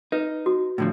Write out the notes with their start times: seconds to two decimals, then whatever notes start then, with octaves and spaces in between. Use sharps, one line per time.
0.12 D#4 B4
0.46 F#4
0.78 A2 D3 F3